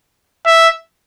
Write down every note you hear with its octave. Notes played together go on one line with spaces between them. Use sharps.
E5